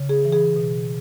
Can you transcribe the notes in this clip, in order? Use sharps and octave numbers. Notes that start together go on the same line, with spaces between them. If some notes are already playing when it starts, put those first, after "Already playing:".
Already playing: C#3
G#4
E3
G#4
B2